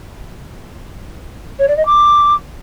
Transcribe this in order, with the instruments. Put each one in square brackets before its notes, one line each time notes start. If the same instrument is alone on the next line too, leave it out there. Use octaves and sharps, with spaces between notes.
[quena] C#5
D5
D#5
D6